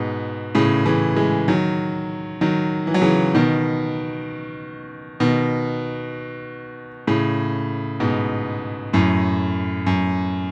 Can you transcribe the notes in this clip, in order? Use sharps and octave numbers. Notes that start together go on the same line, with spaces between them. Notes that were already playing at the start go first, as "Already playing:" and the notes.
Already playing: G#2 B2
A2 C#3
C#3 E3
E3 G#3
D#3 F#3
D#3 F#3
E3
F#3
C#3 E3
B2 D#3
B2 D#3
A2 C#3
G#2 B2
F#2 A2
F#2